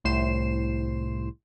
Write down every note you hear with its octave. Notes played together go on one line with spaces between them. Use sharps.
C2 A2 C5 C7 E7